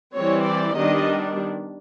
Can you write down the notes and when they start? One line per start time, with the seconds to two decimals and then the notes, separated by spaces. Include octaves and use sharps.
0.14 E3 G3 C4 C#5
0.45 D5
0.77 D#3 G3 B3 D4 D#5